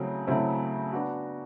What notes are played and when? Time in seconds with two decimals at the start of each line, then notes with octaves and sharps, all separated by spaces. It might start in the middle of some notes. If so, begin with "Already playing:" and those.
Already playing: C#3 F#3 A3 C4 E4
0.27 C#3 F#3 A3 C4 E4
0.93 B3 D4 F#4